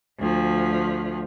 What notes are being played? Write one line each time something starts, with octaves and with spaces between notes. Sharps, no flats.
D2 F3